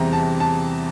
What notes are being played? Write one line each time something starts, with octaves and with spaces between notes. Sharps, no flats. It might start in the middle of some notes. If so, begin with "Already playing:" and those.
Already playing: E2 C3 E3 G3 C4 A#5
A5
A5